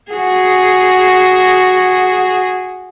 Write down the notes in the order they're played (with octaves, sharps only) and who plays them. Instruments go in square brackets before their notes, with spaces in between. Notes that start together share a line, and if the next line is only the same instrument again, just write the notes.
[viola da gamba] F#4 G#4